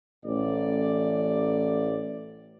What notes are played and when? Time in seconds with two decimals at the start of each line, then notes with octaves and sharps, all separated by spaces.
0.25 A1 D5